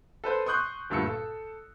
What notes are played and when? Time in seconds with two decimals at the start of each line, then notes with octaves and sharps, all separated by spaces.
0.24 A4 B4 C5
0.46 C6 C#6 D#6 F#6 G6
0.90 D2 G2 A#2 E6 C#7
1.06 A4